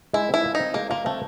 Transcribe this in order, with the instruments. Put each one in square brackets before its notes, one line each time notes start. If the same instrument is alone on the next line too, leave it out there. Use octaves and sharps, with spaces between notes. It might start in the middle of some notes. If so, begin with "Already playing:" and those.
[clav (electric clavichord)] G#3 [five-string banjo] E4
[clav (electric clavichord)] C4 [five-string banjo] E4
[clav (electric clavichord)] F4
[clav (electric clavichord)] C4 [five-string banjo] D#4
[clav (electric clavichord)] G#3 [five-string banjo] A#3
[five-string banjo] A#3 [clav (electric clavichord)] F4
[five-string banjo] A3 [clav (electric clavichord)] C4